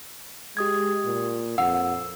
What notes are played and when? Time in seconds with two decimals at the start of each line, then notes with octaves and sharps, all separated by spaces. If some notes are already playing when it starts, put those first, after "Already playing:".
0.57 G#3 G4 D#6 G#6
1.05 A#2
1.58 F2 F#5 E6